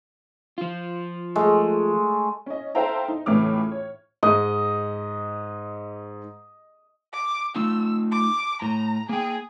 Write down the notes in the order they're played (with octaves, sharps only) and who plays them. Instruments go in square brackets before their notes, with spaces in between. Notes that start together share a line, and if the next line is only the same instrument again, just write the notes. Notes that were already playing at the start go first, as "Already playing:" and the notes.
[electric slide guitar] F3 F4
[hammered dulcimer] G#3 A3
[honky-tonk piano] C#4 D#5
A4 C5 E5 F5 G5 A#5
D#4
C#2 A2 E3 C#4 D6 F6
C#5
[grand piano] G#2 [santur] D#5
[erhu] D6
[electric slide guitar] A3 D#4 F4 [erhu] E6
[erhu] D6
[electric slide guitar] A2 [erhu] A#5
[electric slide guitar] A#3 G5 [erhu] G#4